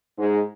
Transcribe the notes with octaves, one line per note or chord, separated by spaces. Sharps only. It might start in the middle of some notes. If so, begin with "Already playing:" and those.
G#2